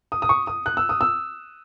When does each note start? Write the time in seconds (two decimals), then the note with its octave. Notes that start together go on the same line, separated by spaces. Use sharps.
0.12 D#6
0.22 D#6
0.29 C#6
0.47 D#6
0.66 F#6
0.77 E6
0.89 D#6
1.01 E6